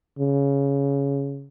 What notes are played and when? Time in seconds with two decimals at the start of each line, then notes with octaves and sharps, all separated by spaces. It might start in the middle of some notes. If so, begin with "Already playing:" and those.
0.19 C#3